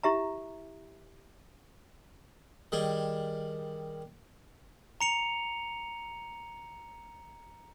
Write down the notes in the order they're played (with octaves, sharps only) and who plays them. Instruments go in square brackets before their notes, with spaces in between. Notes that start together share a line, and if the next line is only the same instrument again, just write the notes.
[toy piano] E4 G4 E5 A#5
[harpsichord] D#3 G3 G#4
[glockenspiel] A#5 C#7 F7